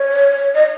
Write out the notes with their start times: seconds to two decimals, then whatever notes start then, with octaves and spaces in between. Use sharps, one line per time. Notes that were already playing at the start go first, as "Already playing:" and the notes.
Already playing: C#5
0.55 D#5